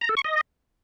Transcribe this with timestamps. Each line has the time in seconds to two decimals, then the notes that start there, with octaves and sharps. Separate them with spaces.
0.01 A#5
0.09 A4
0.17 C#6
0.25 D#5